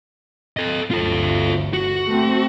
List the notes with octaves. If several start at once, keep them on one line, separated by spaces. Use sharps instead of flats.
A4 D#5
G1 D2 F4 A4
F#4
A3 C4